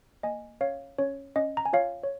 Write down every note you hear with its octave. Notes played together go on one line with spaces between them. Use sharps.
A#3 D#5 G#5
C#4 C#5 F5
C#4 C#5
C#4 D#5
A#5
G#5
F4 C#5 F5
C#5